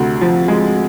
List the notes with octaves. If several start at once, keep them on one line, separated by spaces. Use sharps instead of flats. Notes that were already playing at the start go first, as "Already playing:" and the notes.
Already playing: D2 C3
F3
G#3